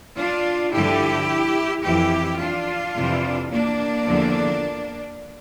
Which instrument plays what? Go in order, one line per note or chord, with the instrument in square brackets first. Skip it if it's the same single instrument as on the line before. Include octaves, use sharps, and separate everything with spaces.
[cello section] D4 F4
G2 D3 F3 E4 G4
F2 E3 E4 G4
D4 F4
F2 C3 E3
A#3 D4
E2 D3 F3